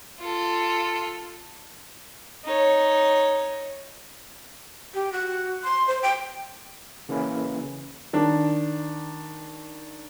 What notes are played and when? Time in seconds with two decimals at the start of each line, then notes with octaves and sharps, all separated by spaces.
0.20 F4 A4
2.44 D#4 C#5
4.94 G4
5.12 F#4
5.64 C6
5.88 C5
6.02 G5
7.09 C#3 E3 A#3 C#4 E4
8.13 D#3 D4